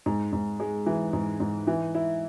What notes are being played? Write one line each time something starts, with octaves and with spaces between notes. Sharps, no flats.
G#2
G#2
G#3
E3
G#2
G#2
E3
E4